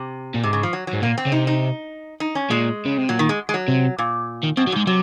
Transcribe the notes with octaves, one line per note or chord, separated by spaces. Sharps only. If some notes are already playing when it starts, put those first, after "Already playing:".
Already playing: C3
A#2
G#2 C3
C#3
F3
F#3
F#3
G#2
A#2 A#3
C4
C#3
C3 D#4
D#4
D#4
C#4
A#2 G#3
C#3
C3
A#2 F#3
D#3
G#3
G#3
F#3
C3
A#2
D#3
F#2 C4
F#3
G#2 G#3
C3 F#3